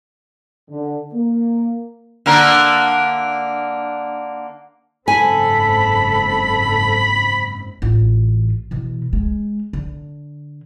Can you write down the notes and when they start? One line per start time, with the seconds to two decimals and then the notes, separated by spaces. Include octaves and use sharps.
0.70 D3
1.14 A#3
2.26 D3 A#3 A#4
5.08 F#1 G#2 C4 A4 G#5 B5
7.82 A1 F4
8.71 B2 E3
9.13 G#3
9.73 D3